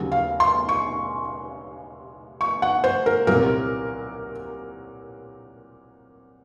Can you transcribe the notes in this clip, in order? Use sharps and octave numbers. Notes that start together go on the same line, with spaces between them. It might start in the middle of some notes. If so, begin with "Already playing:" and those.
Already playing: D#2 C#3 F#3
F5
C6
C#6
C#6
F#5
C5
A#4
C2 A#2 F#3 C4 A#4